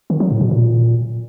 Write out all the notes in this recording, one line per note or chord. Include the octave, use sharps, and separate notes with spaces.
D#3
F#3
A2
B2
A#2